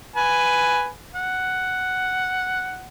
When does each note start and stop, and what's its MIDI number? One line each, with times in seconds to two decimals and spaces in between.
0.16 0.89 71
0.16 0.89 80
1.15 2.88 78